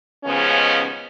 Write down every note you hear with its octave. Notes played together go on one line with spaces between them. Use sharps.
D#2 C#3 F3 G#3 B3 C#4